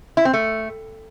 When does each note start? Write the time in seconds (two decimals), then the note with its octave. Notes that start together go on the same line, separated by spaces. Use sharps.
0.17 E4
0.25 C4
0.33 A3